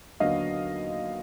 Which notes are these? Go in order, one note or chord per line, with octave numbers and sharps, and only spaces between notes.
D#2 D3 F#3 B3 D#5 F5